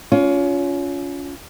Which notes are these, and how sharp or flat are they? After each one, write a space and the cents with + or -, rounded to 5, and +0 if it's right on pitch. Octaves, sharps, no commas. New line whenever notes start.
C#4 +30 F4 +10